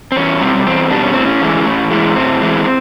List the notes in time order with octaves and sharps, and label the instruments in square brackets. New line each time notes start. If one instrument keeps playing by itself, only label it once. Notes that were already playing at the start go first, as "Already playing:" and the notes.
[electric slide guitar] C4
E2 C#4
B2 G3 C4
E2 C4
B2 G3 D4
C#4
A2 C4
C#4
E3 G#3
A2
E3 G#3
A2 C4
E3 G#3